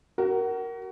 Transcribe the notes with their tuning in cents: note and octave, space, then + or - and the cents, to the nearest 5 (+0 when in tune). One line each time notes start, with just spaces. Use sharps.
F#4 +30 A#4 +0